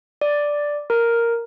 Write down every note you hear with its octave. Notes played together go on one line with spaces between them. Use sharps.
D5
A#4